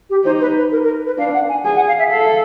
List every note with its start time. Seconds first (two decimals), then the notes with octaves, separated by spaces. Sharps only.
0.10 G4
0.25 D#4 C5
0.41 B4
0.56 B4
0.72 A#4
0.83 A#4
1.06 B4
1.18 D4 F5
1.34 F#5
1.49 G#5
1.65 G#4 G#5
1.76 F#5
1.88 F5
1.99 E5
2.11 A4 F5